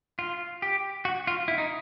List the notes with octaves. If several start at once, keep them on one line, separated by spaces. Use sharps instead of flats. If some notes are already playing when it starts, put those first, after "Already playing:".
F4
G4
F#4
F4
E4
D#4